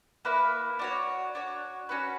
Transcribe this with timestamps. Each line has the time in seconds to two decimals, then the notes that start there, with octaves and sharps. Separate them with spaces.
0.25 A#3 E4 B4
0.79 D4 F#4 C#5
1.35 D4 F#4 C#5
1.89 C#4 F#4 B4